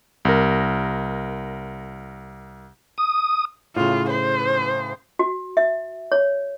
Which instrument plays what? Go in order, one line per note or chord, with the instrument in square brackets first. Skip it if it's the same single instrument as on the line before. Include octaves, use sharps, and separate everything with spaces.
[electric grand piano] C2 A#4
[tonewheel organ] D#6
[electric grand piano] A2 C#3 [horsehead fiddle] F4
[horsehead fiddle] C5
[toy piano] F#4
E5
C#5